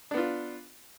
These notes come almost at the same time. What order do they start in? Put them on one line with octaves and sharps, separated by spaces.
D4 B3 F4